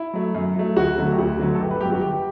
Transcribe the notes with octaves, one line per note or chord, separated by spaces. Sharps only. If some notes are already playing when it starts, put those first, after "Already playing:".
Already playing: E4
F#3 A3
F#2
F#3 A3
D2 F#4
D3 F#3 A3
G4
D2 F#4
D3 F#3 A3
A4
G1 G4
B4
G2 F#3 G4
F#4
G1 G4